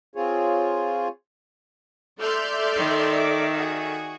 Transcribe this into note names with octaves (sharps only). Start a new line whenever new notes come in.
C4 F4 G#4 C#5
A4 D5 E5 C6 F6 G6
D#3
D6
F#4 G#4